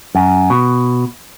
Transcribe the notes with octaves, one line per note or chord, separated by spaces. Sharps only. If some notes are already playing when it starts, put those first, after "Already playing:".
F#2
B2